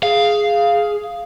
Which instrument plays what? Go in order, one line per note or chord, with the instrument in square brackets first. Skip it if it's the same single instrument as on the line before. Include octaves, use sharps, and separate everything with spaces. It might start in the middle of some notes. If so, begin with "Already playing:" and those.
[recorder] G#4 [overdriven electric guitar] F5